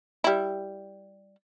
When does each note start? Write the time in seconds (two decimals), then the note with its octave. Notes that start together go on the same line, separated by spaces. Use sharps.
0.24 G3 E4